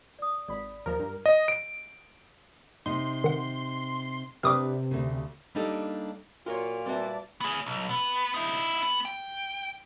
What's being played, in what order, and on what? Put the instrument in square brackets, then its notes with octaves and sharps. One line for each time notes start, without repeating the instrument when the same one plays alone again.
[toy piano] D5 D#6
[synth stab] G#1 B5 [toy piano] D5
[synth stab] D#2 F3 [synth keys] A#4
[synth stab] G2
[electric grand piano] D#5
D7
[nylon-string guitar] C3 D#4 [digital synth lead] C6
[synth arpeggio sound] D#3 F#5
[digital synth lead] C3 [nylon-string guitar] D4 G4 B4 [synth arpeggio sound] D6 D#6 F6
[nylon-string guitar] D2 C#3
G3 A#3 D4 D#4 G4 A4
[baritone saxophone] A#2 [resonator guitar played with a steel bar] F4 A#4 C#5 [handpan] F#4 F5
[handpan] G3 B4 E5 [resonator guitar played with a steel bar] C4 F#4 [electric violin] D5 A5
[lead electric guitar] B3 G#4
B1
B3
D#4 E4
B3
G5